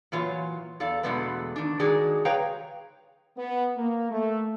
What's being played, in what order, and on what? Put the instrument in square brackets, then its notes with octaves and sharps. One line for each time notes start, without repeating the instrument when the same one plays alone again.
[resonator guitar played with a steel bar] A#2 E3 F#3 F4 C#5
E2 A4 D5 F5
E2 B2 D3 G#3 A3 B3
D#3 D4
D#3 G#3 D#4 F#4 G#4 D5
G#4 B4 C#5 F5 G5 A#5
[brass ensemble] B3
A#3
A3